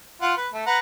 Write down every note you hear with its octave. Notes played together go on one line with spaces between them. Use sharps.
F4 F#5
B4
A3
B4 F#5 A#5